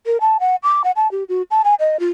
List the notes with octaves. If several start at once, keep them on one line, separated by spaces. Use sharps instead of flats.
A#4
A5
F#5
D6
F#5
A5
G4
F#4
A5
G#5
D#5
F4